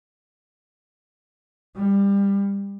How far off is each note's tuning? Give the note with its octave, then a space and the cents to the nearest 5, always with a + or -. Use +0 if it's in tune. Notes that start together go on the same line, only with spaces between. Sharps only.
G3 +25